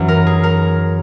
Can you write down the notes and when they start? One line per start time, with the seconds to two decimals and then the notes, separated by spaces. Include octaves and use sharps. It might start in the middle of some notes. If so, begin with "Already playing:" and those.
Already playing: F#2 E3
0.08 A#4
0.26 G#4
0.43 A#4